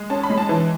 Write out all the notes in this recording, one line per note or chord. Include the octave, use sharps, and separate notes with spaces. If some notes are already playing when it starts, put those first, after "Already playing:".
Already playing: G#3
C#4 A5
B5
G#3
A5
E3